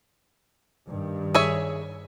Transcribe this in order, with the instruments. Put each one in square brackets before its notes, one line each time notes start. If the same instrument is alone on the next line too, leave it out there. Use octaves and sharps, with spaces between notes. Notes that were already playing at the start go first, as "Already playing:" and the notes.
[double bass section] G2 D#3
[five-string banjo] G#4 C#5 E5